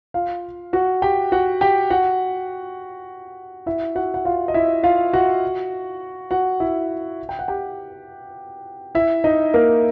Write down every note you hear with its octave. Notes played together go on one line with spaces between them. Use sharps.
F4 F5
F#4 F#5
G4 G5
F#4 F#5
G4 G5
F#4 F#5
E4 E5
F#4 F#5
F#5
F4 F5
D#5
E4 E5
F4 F5
F#4 F#5
F#4 F#5
E4 E5
G5
F#5
G4 G5
E4 E5
D#4 D#5
A#3 A#4